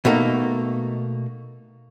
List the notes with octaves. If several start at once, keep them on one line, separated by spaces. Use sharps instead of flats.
B2 A3 A#3 D#4